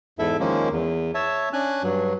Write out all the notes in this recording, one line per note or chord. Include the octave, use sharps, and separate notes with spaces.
E2 G#2 E4 A4 E5
D#3 F3 G#3 A#3 C#4
E2
C#5 E5 A5
C#4 D4 G#5 F#6
G2 F#3